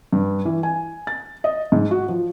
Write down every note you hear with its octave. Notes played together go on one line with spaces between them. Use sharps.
G2
E3
G#5
A6
D#5
G#2
F#4
F3